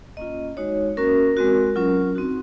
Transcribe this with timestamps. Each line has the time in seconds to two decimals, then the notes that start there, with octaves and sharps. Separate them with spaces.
0.17 A#3 C#4 F4 D#5
0.57 G#3 D#4 F#4 C#5
0.97 A#3 C#4 F#4 A#4
1.37 G#3 C4 F#4
1.76 F#3 C#4 F4
2.15 C4 D#4 F#4